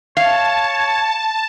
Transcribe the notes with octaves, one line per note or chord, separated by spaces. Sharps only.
C#5 F5 A5